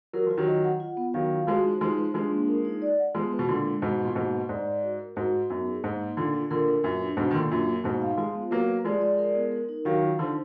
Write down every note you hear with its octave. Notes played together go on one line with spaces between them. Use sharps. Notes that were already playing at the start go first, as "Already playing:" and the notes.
F#3 A#4
F3 F4
D#3 F#3
D#5
F#5
F4
B3
D#3 F#3 F5
F4
F3 G#3 F#4
D#4
F3 G#3 D#4
B4
F3 G#3 D4
A#3
A#4
D#4
D5
F#5
F3 G#3 B3
B4
B2
A#2 D3 G#3
G#3
G#2 B2 B3
B4
A#2
G#2 B2 A#3
B4
G#2 D5
D5
F#4
A#4
G#2 F#4
D#4
F#2 B3
G#4
G#2 A#3
D#4
A#2 D3 F4
F4
A#2 D3 A#4
A#4
F#2 A#2 B4
D4
G#2 B2 D4
D#3
A#2 D3 A#3
F#2 A#2 F4
A#3
G#2 B2 D#4
F5
F3 G#3 F4
B3
F#3 A#3 B4
B4
F3 G#3 D5
D5
A#4
B3
A#4
D#4
D#3 F#3 F5
F4
D3 F3 D#4